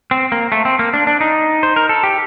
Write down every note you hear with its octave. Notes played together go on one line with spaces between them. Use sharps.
C4
A#3
A3
C4
A#3
D4
D4
D#4
C5
A#4
A4
G4